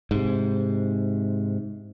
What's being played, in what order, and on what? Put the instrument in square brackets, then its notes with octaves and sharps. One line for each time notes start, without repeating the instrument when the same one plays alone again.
[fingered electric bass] G#2 C3